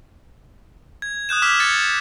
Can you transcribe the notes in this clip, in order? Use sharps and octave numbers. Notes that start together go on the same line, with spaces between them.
G#6
D#6 F#6 G6 E7
D6 F6 G#6 B6 E7
G#6 A6 C#7